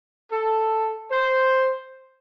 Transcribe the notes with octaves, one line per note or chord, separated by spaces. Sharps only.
A4
C5